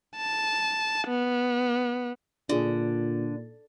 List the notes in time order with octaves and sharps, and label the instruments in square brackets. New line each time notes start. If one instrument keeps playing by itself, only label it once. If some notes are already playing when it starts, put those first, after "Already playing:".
[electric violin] A5
B3
[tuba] A#2 [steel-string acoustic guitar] D3 [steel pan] D4 G#4 [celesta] F4